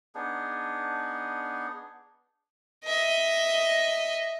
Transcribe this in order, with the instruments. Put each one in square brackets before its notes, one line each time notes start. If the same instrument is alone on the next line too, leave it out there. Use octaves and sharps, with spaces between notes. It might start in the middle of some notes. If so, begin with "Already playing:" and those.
[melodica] B3 D4 D#4 G#4
[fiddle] D#5 E5